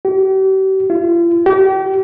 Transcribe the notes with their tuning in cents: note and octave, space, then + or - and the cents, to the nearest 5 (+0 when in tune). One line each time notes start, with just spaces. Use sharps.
G4 -40
F4 -45
G4 -35